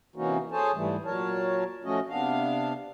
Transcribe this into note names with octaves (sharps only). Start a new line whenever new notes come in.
C3 E3 A#3 C#4 D#4 F#4
G#4 A4 C5 C#5 G#5 A5
G#2 E3 G3 A3
A#2 F#3 A#4 C#5 A5
F3 A3 C#4 F#4 D#5
C3 B3 D4 F5